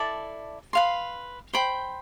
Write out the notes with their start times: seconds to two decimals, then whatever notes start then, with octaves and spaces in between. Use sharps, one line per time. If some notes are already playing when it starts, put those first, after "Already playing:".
Already playing: E4 A4 D5 A5
0.73 B4 F5 C6
1.53 C5 G5 B5